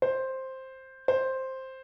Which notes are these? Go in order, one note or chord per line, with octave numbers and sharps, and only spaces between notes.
C5
C5